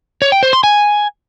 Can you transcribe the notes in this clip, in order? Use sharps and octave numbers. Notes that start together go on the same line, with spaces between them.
C#5
G5
C5
C6
G#5